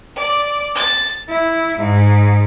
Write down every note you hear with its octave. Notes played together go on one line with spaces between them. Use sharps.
D5
A6
E4
G#2